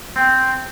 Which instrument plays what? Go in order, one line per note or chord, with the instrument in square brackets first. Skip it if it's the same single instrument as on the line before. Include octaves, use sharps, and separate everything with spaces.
[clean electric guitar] C4